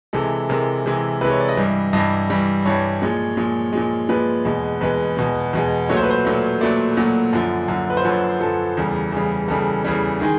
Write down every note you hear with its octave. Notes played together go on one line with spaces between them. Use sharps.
C3 E3 G#3 A4
C3 E3 G#3 A#4
C3 E3 G#3
C3 E3 G#3 B4
C#5
D5
D#5
G2 E3 G3
G2 E3 G3 D#5
G2 E3 G3
G2 E3 G3 C#5
A#2 F3 G#3
A#2 F3 G#3
A#2 F3 G#3
A#2 F3 G#3 B4
E2 B2 G#3
E2 B2 G#3 B4
E2 B2 G#3
E2 B2 G#3
A#2 F#3 A3 C#5
C5
B4
C5
A#2 F#3 A3
A#2 F#3 A3 D5
A#2 F#3 A3
F#2 D3 F3
F#2 D3 F3
B4
C5
F#2 D3 F3 C#5
F#2 D3 F3 A4
E2 C#3 E3 G3
E2 C#3 E3 G3
E2 C#3 E3 G3 A4
E2 C#3 E3 G3
D#3 G#3 G#4